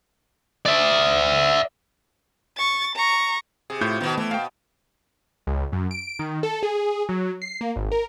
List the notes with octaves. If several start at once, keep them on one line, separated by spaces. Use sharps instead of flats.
D5 E5
C#6 A6
A#5 C#6
C3 G#4
A2 F4 G6
B2 D#3 B3
E3 A3
B2 F5 G5
C#2
F#2
D7
D#3
A4
G#4
F#3
C7
A#3
G#1
A#4